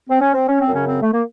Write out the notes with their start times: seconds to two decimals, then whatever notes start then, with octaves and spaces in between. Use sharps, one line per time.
0.09 C4
0.21 C#4
0.34 C4
0.48 C#4
0.60 C4
0.67 F#2
0.72 C#3 C#4
0.87 C4
1.02 A3
1.12 A#3